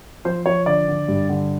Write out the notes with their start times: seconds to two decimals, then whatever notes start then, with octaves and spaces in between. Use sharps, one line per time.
0.25 F3 C5
0.46 F3 C#5
0.66 D3 D5
0.88 D3
1.08 G2
1.29 D3